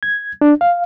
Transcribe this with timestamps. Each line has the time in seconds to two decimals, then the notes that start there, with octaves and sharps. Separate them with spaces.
0.03 G#6
0.41 D4
0.61 F5